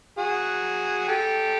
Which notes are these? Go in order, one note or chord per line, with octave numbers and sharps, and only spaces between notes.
F#4 G#4
G4 A4